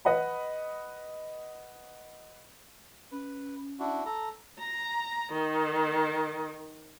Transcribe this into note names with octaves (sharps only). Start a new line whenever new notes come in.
B4 D#5 F#5 B5
C#4 B4
D4 E4 F#4
A4 A#5
A#5
D#3